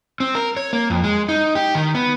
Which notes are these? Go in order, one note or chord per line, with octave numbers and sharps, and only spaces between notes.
C4
A#4
C#5
A#3
F2
G#3
D#4
G4
D#3
B3